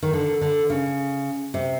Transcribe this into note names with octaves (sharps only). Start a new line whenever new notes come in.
D#3
D3
D3
C#3
C3